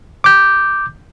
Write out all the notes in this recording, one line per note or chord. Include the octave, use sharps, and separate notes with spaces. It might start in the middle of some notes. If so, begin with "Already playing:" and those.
D6 G6